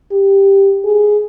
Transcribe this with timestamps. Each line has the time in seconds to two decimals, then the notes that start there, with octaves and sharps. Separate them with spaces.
0.11 G4
0.85 G#4